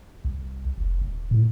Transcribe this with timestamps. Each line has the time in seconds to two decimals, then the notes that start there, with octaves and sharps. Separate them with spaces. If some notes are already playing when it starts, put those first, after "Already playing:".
0.25 C2
0.78 F1
1.01 D#1
1.31 A2